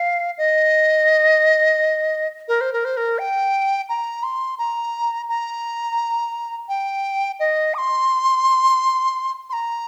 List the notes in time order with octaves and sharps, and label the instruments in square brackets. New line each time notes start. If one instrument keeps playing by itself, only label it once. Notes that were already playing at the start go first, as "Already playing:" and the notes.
Already playing: [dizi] F5
D#5
A#4
C5
A#4
C5
A#4
G5
A#5
C6
A#5
A#5
G5
D#5
D#6
C6
C6
A#5